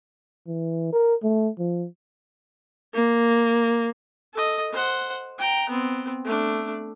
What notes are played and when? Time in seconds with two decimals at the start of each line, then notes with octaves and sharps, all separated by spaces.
0.47 E3
0.93 A#4
1.23 A3
1.59 F3
2.95 A#3
4.34 A4 D#5
4.73 C5 F#5
5.38 G5 A#5
5.70 B3 C4
6.25 A3 D4